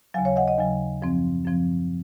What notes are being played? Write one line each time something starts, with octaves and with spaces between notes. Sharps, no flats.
D#2 C#3 F#3 F5 G#5
C#5 F5
D#5 F#5
D#5 F#5
D#2 C#3 F#3 F5 G#5
F#2 F3 C4
F#2 F3 C4